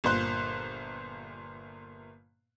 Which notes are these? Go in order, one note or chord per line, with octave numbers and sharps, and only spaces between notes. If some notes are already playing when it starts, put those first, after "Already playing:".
G1 A#2 C5 F#6